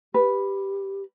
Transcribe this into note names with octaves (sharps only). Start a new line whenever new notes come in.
G4 B4